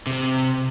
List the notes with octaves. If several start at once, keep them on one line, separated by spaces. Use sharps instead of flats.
C3